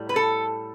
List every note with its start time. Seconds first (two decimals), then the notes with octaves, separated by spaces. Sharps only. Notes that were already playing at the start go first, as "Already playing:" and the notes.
Already playing: A2 G3
0.09 B4
0.16 A4